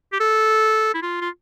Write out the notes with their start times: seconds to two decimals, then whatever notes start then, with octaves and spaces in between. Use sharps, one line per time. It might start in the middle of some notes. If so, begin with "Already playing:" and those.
0.12 G4
0.20 A4
0.94 E4
1.02 F4
1.21 F4